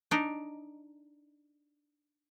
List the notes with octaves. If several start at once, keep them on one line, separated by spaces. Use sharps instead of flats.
D4 D#4